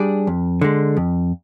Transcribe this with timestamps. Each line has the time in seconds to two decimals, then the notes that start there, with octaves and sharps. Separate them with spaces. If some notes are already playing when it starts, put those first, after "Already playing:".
Already playing: G3 D4 G#4 D5
0.27 F2
0.61 D3 G#3
0.97 F2